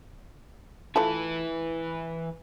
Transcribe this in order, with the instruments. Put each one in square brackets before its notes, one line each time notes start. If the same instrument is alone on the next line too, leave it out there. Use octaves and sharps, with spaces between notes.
[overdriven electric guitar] E3 B4 [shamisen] A3 F4 A4